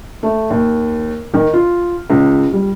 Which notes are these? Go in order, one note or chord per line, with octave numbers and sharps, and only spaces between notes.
A3
D#2
D#3
F4
C#2
G3